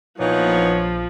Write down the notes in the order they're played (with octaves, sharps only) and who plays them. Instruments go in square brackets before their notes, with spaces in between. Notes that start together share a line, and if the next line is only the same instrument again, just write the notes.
[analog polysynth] A#1 [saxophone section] A#2 E3 D#4 [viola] F3 [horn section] B3 C#5